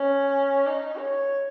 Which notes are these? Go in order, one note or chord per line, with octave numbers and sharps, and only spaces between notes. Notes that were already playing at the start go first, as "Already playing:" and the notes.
Already playing: C#4
D#4
C#5